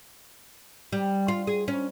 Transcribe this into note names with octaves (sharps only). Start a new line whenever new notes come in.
G3
F4
G#4
C#4